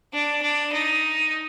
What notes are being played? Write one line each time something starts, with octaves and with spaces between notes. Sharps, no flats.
D4
D4
D#4